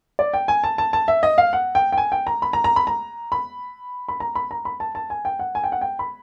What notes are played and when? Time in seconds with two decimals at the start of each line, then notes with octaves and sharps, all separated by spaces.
0.19 D5
0.34 G5
0.48 G#5
0.64 A5
0.78 A5
0.93 A5
1.08 E5
1.23 D#5
1.38 F5
1.53 F#5
1.75 G5
1.92 G5
1.98 G#5
2.12 G5
2.27 A#5
2.42 B5
2.53 A#5
2.64 A#5
2.76 B5
2.87 A#5
3.32 B5
4.08 B5
4.20 A#5
4.35 B5
4.51 A#5
4.65 B5
4.80 A5
4.95 A5
5.10 G#5
5.25 G5
5.39 F#5
5.55 G#5
5.64 G5
5.72 F#5
5.81 G5
5.99 B5